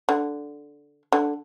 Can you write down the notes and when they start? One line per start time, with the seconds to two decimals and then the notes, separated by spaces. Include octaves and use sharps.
0.09 D3
1.12 D3